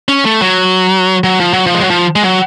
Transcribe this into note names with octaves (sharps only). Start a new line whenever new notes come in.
C#4
A3
F#3
F#3
F3
F#3
F3
G#3
F#3
F3
G#3
F#3